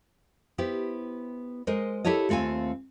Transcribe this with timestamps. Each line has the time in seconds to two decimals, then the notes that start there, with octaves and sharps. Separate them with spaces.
0.58 B3 E4 G4 C5
1.67 G#3 A#4 C5 D#5
2.05 E4 G4 A4 C#5 D#5
2.29 D#2 A3 C4 F4 G#5